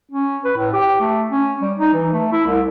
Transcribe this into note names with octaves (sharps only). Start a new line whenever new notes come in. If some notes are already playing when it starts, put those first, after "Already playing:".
C#4
B4
A2
G4
A3
C#4
G3
D#4
E3
A3
E4
C2